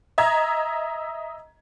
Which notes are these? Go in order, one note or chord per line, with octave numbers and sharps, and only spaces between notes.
D#5 E5 A#5 G#6